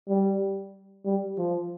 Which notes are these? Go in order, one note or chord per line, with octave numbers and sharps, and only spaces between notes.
G3
G3
F3